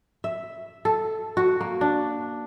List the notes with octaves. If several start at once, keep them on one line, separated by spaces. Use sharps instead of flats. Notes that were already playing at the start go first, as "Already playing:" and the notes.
E5
A4
F#4
A#3
D4